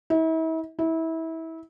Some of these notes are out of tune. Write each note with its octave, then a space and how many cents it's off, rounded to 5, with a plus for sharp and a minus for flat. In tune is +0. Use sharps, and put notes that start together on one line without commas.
E4 -40
E4 -25